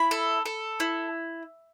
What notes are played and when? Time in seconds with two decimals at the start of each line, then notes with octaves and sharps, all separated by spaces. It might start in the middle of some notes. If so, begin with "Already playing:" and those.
Already playing: E4 B5
0.11 A4
0.46 A4
0.80 E4